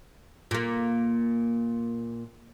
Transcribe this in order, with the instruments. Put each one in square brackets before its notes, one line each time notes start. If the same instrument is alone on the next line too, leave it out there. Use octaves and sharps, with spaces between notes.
[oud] A#2 A#3